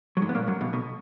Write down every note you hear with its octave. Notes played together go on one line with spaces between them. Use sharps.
F#3
G#2 G#3
B3
A#2 A#3
F#2 F#3
B1 B2
B1 B2